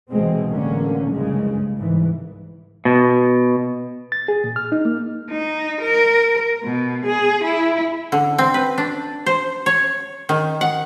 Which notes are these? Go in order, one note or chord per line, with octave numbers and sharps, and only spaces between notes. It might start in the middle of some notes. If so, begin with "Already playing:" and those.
C2 B2 E3 G#3 C4
A1 D3 F#3 A#3 C#4
F#1 C2 G2 C#3 G#3
C2 G#2 E3
B2
A6
G#4
A#2
F6
D#4
A#3
D#4
A#4
B2
G#4
E4
D3
C4
B4
D4
C5
C#5
D#3
F#5